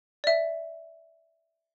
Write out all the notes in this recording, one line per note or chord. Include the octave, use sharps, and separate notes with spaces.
D5 E5